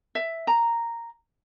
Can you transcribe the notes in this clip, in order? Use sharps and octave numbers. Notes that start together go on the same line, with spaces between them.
E5
A#5